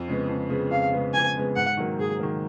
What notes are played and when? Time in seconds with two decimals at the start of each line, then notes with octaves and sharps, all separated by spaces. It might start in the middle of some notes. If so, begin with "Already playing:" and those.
Already playing: F2
0.08 C#3 G#3 B3
0.29 F2
0.49 C#3 G#3 B3
0.71 F2 F5
0.93 C#3 G#3 B3
1.13 F2 G#5
1.35 C#3 G#3 B3
1.56 G#2 F#5
1.77 D#3 F#3 A#3
1.99 G#2 G#4
2.20 D#3 F#3 A#3